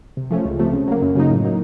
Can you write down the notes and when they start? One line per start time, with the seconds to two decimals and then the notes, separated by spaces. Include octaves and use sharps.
0.17 C3
0.30 F3 A3 C#4
0.45 C#2
0.59 C3 F3 A3
0.73 C#3
0.88 F#3 A#3
1.02 F#2
1.15 C#3 F#3 A#3 D#4
1.30 A2
1.44 F#3 A#3 D#4